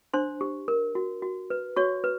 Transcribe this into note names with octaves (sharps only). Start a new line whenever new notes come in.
D4 C5 C6
G4
A#4
F#4
F#4
B4
F#4 C#5 C#6
B4